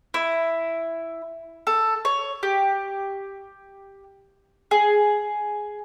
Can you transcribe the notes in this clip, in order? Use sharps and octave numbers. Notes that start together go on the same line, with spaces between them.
E4
A4
C#5
G4
G#4